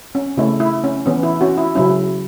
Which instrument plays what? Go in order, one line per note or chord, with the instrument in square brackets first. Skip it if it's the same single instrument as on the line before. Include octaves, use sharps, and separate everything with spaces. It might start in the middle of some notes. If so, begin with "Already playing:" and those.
[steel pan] C#4
C#3 A3 C#4 E4
E4
C#4
E3 B3 C#4
E4
C#4 F#4
E4
C#3 F#3 C#4 E4